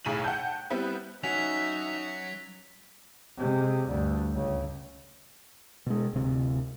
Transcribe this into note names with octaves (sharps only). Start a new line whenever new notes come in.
B1 A2 G#4 D#7 F#7
F#5 G5 A5 G6
G3 B3 C4 E4
F#3 C#4 D#4 F#4 C#5 E5 B6 F7
C3 G#3
D2 G2
C#2 C#3
B2 G#3
D1 C3